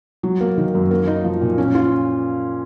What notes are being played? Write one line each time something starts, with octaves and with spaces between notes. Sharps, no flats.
F#3
A#3
D#3
F#2
A#3
D#4
F3
A#2
C#4
F4